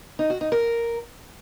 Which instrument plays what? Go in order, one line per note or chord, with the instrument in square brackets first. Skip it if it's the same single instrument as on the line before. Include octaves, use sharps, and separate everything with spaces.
[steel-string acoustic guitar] D#4
F#4
D#4
A#4